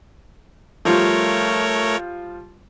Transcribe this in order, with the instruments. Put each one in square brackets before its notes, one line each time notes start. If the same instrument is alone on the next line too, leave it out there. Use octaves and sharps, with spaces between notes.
[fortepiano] F3 G3 F4 [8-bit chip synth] A3 A#4 C#5